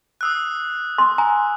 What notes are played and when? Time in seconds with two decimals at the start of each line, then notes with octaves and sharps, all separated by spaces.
0.21 D#6 E6 F#6
0.98 C6
1.18 G#5 A#5